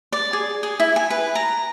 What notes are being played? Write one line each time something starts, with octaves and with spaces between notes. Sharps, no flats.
D5
G#4
G#4
E4
G#5
B4
A#5